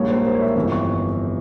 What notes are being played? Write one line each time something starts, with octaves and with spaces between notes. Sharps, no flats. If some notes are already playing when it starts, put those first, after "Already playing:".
Already playing: A#1 G#2 G3 A#3 C#5
C5
A#4
C5
C#5
E5
G1 F2 E3 E5
C#6